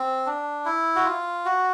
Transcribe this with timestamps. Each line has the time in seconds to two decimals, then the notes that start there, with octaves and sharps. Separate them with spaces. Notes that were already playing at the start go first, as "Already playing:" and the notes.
Already playing: C4
0.26 D4
0.65 E4
0.96 F#4
1.05 F4
1.45 F#4